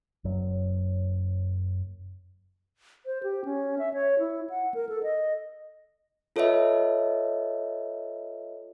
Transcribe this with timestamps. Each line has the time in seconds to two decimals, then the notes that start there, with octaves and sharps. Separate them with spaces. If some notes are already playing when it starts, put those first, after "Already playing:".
0.24 F#1 F#2 F#3
3.06 C5
3.23 G4
3.45 C#4
3.79 E5
3.94 C#5
4.19 E4
4.50 F#5
4.74 A#4
4.89 A4
5.03 D#5
6.36 F4 A4 B4 C#5 D#5 E5